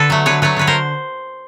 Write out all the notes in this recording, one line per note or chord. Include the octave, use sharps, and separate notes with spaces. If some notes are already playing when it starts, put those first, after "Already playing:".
Already playing: D3 A4 B4
F#3 A3
D3 B4 C#5
F#3 A3 B4 C#5
D3 B4 C#5
A#4 C5